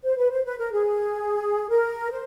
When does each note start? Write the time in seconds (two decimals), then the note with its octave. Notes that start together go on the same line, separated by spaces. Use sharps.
0.03 C5
0.17 B4
0.30 C5
0.45 B4
0.58 A#4
0.72 G#4
1.69 A#4
2.11 C5